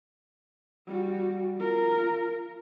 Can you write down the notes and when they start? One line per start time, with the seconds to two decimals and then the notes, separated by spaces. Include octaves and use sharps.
0.87 G3 F#4
1.57 F4 A#4